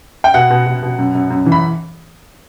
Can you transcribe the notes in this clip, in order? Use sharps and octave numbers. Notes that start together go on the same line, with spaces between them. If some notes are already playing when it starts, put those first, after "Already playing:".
G5
B2 F#5
B2
B2
B2
F#2
F#2
F#2
E3
B5